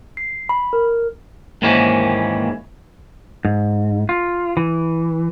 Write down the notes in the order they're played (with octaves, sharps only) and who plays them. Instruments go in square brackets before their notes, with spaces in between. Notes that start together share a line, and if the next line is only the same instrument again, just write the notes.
[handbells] C7
B5
A#4
[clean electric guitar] D#2 G#2 E3 A#3 C#4
[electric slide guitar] G#2
F4
E3